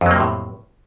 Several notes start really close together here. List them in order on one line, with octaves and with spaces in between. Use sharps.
F2 F#3 A#3 C3 A2